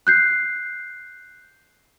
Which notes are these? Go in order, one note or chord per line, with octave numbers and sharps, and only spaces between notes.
F#6 G6 C7